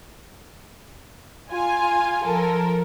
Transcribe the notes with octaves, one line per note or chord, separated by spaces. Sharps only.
F4 G#5
F3 A4 A#4